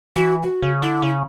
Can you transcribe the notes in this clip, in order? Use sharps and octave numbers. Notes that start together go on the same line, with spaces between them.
E3 F#4
F#4
C#3
D3 E4
C#3